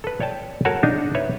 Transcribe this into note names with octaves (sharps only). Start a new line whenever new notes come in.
A4 B4
C#5 D5 G5 A5
F#4 A4 A#4 C#5 F#5 A5
D4 D#4
B4 C#5 E5